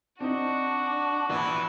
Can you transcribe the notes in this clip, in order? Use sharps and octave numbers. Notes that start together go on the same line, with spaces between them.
C4 D4 D#4 F#4
A#1 E3 B3